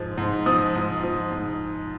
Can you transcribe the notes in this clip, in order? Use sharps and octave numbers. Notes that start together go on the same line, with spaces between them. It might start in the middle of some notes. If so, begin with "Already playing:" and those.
Already playing: G#2 F3
G#2
F3 D#6
G#2
F3
G#2